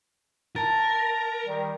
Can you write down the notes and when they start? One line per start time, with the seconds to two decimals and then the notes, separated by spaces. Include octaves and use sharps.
0.56 A#4 A5 A6
1.44 D#3 G3